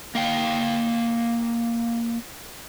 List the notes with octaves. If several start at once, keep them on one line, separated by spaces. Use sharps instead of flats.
A#3 F5 G5